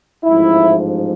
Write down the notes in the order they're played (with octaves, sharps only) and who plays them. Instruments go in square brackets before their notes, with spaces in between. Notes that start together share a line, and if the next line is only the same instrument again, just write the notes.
[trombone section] A1 G#2 F3 E4